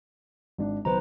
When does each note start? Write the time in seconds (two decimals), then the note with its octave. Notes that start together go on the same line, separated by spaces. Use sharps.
0.58 G#1 D4
0.85 B1 D#3 B4 C5 A#5